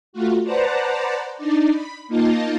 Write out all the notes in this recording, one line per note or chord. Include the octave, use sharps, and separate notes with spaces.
A3 F4 F#4
B4 C5 D5 F#5 A5 A#5
D4 D#4 D5
B5
A#3 D#4 F4 D#5 A5